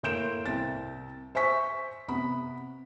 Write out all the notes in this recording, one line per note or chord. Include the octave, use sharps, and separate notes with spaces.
A2 A#3 C6 G6 D7 E7
C2 A6
C5 E5 G#5 C#6 B6
C3 B3 B5